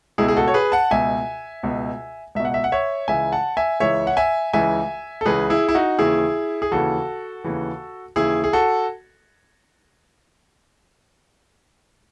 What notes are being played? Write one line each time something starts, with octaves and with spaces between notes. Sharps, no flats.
C#2 B2 E4 G#4
G#4
F#4 A4
C#5
G#4 B4
F#5 A5
C#2 B2 E5 G#5
C#2 B2
C#2 B2 E5
F#5
E5
F#5
C#5 E5
C#2 C#3 E3 E5 G#5
F#5 A5
E5 G#5
C#2 C#3 E3 C#5 E5
F#5
E5 G#5
C#2 C#3 E3 E5 G#5
A4
C#2 C#3 E3 G#4 B4
E4 G#4
E4
D#4 F#4
D#2 C#3 E3 E4 G#4
G#4
D#2 C#3 E3 F#4 A4
D#2 C#3 E3
D#2 C#3 E3 E4 G#4
G#4
F#4 A4